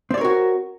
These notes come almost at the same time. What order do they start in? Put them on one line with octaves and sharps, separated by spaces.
C4 D5 C#5 A#4 F#4